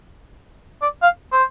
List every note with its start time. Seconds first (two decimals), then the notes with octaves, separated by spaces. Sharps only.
0.82 D5
1.02 F5
1.32 C5